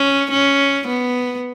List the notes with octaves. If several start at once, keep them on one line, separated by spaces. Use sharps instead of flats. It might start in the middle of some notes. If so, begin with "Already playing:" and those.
Already playing: C#4
C#4
B3